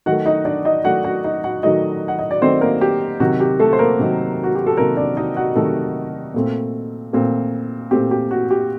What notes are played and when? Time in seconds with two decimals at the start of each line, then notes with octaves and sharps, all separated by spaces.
0.06 D#3 F#3 A3 F#4 F#5
0.26 D#4 D#5
0.45 D4 D5
0.65 D#4 D#5
0.84 D#3 F#3 A3 F#4 F#5
1.04 F#4 F#5
1.24 D#4 D#5
1.44 F#4 F#5
1.63 D#3 F#3 A3 D#4 D#5
2.08 F#5
2.19 D#5
2.31 D5
2.42 D#3 F#3 A3 C4 C5
2.61 A#3 A#4
2.81 G4
3.20 C3 D#3 F#3 F#4
3.40 G4
3.60 A3 A4
3.73 C5
3.79 A#3 A#4
3.99 C3 D#3 F#3
4.44 F#4
4.55 G4
4.67 A4
4.77 C3 D#3 F#3 A#3 A#4
4.97 D4 D5
5.17 D#4 D#5
5.36 F#4 F#5
5.55 C3 D#3 F#3 A3 A4
6.34 A#2 A3 C4
7.13 A#2 A3 C4
7.91 A#2 A3 C4 G4
8.11 G4
8.31 F#4
8.51 G4